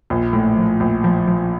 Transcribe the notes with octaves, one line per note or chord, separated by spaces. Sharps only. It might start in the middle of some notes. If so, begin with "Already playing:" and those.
A#1
A2
F3
A#1
F3
F3